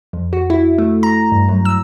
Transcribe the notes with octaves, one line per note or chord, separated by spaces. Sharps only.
F2
F#4
E4
A3
A#5
G2
F#2
E6